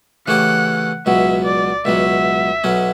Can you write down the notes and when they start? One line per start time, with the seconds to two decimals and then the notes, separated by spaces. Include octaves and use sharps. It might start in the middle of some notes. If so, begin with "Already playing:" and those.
0.27 C#3 E3 A3 C#4 G4 F#5
1.06 C#2 B2 F#3 E5
1.45 D5
1.85 C#2 B2 F#3 E5
2.64 B1 B2 F#3 C#4